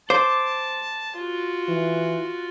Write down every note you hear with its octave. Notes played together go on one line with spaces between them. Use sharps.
C5 A5 D6
F4 F#4
E3